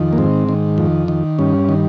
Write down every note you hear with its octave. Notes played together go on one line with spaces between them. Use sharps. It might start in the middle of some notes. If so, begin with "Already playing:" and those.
Already playing: F2 D#3
A#3
G#2 C4
D#3
F2
D#3
G2 C#4
D#3